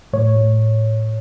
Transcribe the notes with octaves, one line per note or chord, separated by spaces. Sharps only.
A2 C#5
A2